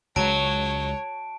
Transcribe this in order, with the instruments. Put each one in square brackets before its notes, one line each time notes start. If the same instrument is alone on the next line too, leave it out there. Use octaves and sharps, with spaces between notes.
[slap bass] C#2 G#3 [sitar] F#3 [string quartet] C#5 [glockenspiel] A5 D7